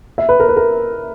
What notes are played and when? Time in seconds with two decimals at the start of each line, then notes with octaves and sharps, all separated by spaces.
0.18 E5
0.29 B4
0.40 A#4
0.49 B4
0.56 A#4